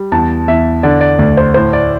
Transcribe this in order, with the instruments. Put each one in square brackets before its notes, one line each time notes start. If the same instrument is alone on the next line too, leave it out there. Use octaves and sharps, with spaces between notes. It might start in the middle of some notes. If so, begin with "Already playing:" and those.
Already playing: [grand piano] G3
E2 A5
E2 E5
D3 D5
D5
D2 D5
C5
A2 C5
D5